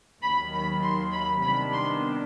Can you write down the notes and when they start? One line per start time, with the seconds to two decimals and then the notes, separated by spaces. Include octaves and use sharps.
0.22 D#2 D#3 F#3 B5
0.53 B5
0.82 C6
1.13 B5
1.42 C3 D#3 G3 B3 D4 B5
1.72 C6